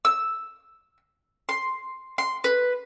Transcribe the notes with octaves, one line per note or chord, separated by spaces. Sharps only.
E6
C6
C6
B4